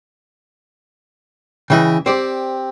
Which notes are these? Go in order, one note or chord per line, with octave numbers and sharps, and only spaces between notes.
C#3 E3 D#5 E5 G5
C4 G4 C5 D5